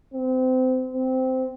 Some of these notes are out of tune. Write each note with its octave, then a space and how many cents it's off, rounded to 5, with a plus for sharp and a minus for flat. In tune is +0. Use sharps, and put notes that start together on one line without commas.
C4 -25
C4 -15